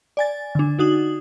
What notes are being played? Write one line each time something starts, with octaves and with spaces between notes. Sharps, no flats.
D5 G#5 A6
D3 D4
D#4 F#4 D#6 F#7